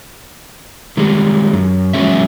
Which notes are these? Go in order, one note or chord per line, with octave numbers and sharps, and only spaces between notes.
D#3 G3 G#3
F#2
E2 F3 F#3 G#3 C#4 E5